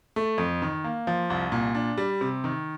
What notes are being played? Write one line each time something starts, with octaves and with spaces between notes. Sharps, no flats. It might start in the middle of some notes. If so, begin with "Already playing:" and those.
A3
F2
D#3
A#3
F3
C2
A#2
D4
G3
C3
D#3